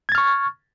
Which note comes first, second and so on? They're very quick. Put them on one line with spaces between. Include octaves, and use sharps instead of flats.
G#6 A6 F6 C#6